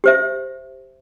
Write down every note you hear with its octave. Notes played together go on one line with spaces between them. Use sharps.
G4 C5 E5